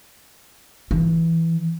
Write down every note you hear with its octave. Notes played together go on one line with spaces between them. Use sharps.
E3